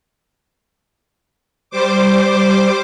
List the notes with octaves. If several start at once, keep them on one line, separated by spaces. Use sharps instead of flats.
G3 C5 D6